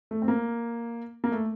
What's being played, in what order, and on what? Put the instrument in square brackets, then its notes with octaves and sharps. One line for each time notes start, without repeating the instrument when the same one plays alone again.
[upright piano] A3
C4
A#3
A#3
A3